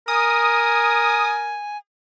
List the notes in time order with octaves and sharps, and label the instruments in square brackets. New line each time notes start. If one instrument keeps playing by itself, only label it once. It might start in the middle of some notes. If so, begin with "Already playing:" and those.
[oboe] A#4 [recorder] G#5 [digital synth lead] D#6